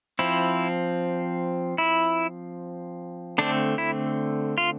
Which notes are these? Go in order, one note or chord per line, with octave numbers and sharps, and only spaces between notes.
F3 C4 E4
E4
D3 A3 C4 D4
E4
F4